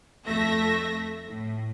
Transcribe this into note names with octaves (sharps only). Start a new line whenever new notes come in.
F2 A3 E5 A#6
A2